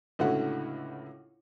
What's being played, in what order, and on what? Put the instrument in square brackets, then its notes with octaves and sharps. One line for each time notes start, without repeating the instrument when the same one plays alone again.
[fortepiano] C#2 A2 D3 E4 F#4 F#5